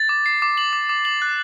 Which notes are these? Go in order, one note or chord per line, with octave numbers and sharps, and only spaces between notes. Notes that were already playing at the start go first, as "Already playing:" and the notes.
Already playing: A6
D6
C7
D6
F#7
D6
D6
F#7
F#6